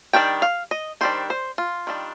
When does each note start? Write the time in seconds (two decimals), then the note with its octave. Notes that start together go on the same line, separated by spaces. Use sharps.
0.13 D#3 G3 D4 G5
0.42 F5
0.71 D#5
1.01 D#3 G3 D4 C5
1.30 C5
1.58 F4
1.87 D#3 G3 D4